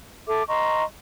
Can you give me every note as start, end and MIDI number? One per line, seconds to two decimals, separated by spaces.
0.28 0.43 69
0.28 0.43 76
0.28 0.43 86
0.48 0.84 75
0.48 0.84 82
0.48 0.84 84
0.48 0.84 85